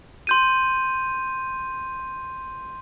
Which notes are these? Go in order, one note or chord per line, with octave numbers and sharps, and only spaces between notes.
C6 G6 D#7